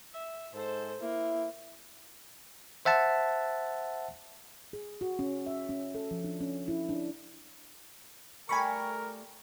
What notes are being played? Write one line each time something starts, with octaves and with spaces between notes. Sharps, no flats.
E5
G#2 A4 C5
A#3 E4
C5 E5 F#5 A5
G#4
F#4
C#4
E5
C#4
A4
F3
D4
C#4
E4
D4
G3 A3 G4 A#4 G#5 B5 C#6